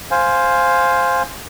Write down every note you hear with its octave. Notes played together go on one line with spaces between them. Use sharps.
C5 F5 G#5